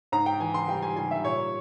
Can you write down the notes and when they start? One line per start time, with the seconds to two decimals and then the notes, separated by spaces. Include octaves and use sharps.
0.12 G#2 A#5
0.26 G5
0.40 E3 G#5
0.54 C6
0.68 G3 G5
0.82 G#5
0.96 G3 G#5
1.11 E5
1.24 A#2 C#5